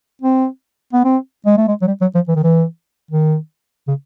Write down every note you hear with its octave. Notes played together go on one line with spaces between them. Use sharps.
C4
B3
C4
G#3
A3
G#3
F#3
G3
F#3
F3
E3
D#3
E3
D#3
C#3